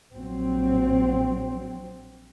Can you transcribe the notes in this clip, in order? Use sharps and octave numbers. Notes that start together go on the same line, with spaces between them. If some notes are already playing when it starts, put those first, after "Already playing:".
A#1 F#3 C4